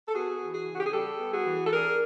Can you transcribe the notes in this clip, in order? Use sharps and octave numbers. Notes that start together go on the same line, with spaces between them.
A4
B3 F#4 G#4
E3
F#4 G#4
C#3 F#4
G4
G#4
G3 G4 A4
B3
F#4 G#4
E3
A4
D4 G#4 A#4